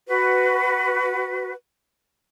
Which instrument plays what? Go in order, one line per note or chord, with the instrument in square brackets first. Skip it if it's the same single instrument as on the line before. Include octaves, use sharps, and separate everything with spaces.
[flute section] F#4 B4